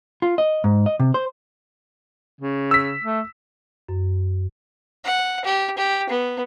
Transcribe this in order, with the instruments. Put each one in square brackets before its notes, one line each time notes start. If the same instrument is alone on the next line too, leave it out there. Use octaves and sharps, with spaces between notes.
[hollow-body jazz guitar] F4
D#5
G#2
D#5
C3
C5
[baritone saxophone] C#3
[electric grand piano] E6 B6
[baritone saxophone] A3
[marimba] F#2
[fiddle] F#5
G4
G4
B3